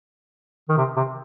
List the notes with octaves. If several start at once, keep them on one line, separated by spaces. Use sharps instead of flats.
D#3
C3
C3